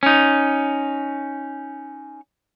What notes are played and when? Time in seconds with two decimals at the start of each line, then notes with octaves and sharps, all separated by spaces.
0.03 C#4 D#4